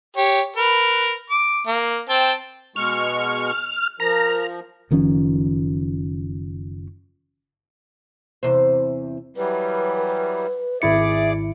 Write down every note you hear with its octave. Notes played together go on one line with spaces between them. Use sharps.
G4 C#5
A#4 B4
D6
A#3
C4 G5 A5
B2 G#3 C#6 F6
F3 A#4 A#5
F#1 D#3 F3 C#4
E2 C3 C5
E3 F#3 G3 B4
G#1 E4 G#4 D5 E5 D6 C#7